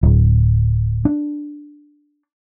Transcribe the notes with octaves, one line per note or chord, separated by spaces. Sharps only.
D1
D4